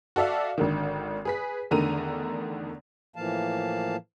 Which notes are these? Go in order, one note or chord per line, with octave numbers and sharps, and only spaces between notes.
F#4 A4 D5 E5 F5
G#1 D3 D#3
G#4 B4 B6
E2 D3 D#3 A3 A#5 D#7
A2 E3 F3 A#3 F5 A5